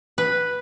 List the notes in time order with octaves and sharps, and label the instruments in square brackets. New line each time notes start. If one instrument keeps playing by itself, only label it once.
[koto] B4